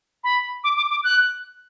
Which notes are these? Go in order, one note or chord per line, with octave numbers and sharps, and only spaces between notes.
B5
D6
D6
D6
F#6